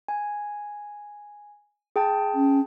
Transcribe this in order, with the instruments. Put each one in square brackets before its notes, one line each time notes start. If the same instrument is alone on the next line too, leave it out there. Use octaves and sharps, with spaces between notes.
[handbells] G#5
G#4 G5 A5
[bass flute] C#4